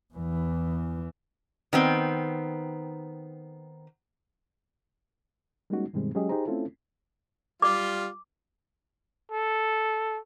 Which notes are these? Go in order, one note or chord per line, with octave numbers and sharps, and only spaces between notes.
E2 E3
D#3 B3 C4
G3 G#3 A#3 C#4 D#4 F#4
G2 B2 D#3 G3 G#3 C4
F#3 G#3 C#4 G4 G#4 D#5
D#4 G4 G#4 C5 A#5
A3 C4 C#4 E4 F4 A4
G3 F4 D6
A4